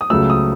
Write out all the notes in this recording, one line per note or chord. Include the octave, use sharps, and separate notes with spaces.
D#6
C#2 C#3 F#3 A3 E6
D#6